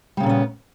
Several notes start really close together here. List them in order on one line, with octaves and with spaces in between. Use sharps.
G3 C#3 A#2 C#4 B3